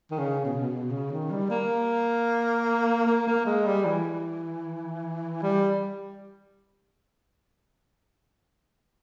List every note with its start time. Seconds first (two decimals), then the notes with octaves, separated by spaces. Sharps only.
0.11 D#3
0.18 C#3
0.45 B2
0.53 C#3
0.60 B2
0.71 B2
0.90 C#3
1.11 D#3
1.31 G3
1.50 A#3
3.07 A#3
3.27 A#3
3.46 G#3
3.66 G3
3.85 E3
5.43 G3